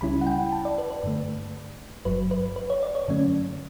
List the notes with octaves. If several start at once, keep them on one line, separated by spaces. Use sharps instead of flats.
C#2 C#3 G3 C#4 E4 B5
F#5
G5
A5
D5
B4
B4
G2 D3 A3
G1 G2 F#3 B4
B4
B4
C#5
D5
C#5
G2 D3 F#3 A3 C#4